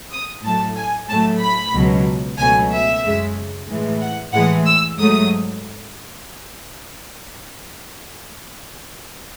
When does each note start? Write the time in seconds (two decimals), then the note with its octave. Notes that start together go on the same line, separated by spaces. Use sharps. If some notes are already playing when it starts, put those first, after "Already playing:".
0.11 D#6
0.43 A2 F#3 A3 A5
0.76 G#5
1.08 A2 F#3 A3 A5
1.41 B5
1.74 C#2 B2 F#3
2.38 C#2 B2 F#3 A3 G#5
2.72 E5
3.03 F#2 C#3 G#3
3.68 A2 E3 G#3
4.01 F#5
4.33 A2 E3 G#3 F#5
4.66 E6
4.98 G#2 F#3 A3 D#6